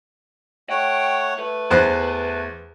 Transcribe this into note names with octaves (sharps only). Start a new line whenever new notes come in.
A3 C#5 F#5 G5
A3 B4
E2 C5 F#6